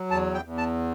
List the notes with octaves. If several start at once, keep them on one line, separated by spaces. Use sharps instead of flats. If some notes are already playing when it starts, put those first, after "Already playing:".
Already playing: F#3
E2 A5
G5
E2
A5